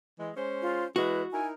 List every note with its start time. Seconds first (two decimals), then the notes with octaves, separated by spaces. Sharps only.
0.19 E3 G#3
0.36 G#3 C#4 C5
0.62 F4
0.96 E3 G#3 E4 F#4 B4
1.32 D#4 E4 A#4 G#5